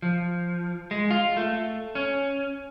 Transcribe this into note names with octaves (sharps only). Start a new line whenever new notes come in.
F3
G#3
F4
A3
C#4